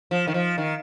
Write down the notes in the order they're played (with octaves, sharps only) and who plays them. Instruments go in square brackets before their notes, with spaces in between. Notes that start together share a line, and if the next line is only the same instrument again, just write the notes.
[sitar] F3
D#3
F3
D#3